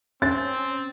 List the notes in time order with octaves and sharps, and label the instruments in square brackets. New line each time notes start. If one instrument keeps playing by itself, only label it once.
[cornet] C4 [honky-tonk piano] C#4 [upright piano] A6